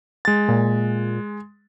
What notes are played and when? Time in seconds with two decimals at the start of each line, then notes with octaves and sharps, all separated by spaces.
0.25 G#3 A6
0.48 A#2